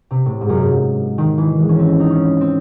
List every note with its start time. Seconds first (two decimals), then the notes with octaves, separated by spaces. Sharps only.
0.11 C3
0.26 A2
0.41 G#2
0.49 F#2
0.58 G#2
1.18 D#3
1.38 E3
1.59 G#3
1.69 C#4
1.79 C4
2.00 D#4
2.10 C#4
2.41 C4